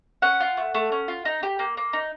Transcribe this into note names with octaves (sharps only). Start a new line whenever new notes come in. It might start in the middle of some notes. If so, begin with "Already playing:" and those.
C#4 F#5
F4
A3
A3
C#4
F4
D#4
G4
A#3
A#3
D#4